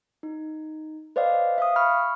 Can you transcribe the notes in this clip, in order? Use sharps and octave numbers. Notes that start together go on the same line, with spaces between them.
D#4
B4 C5 D5 D#5 F5
E5 F5 D#6
B5 C#6 F6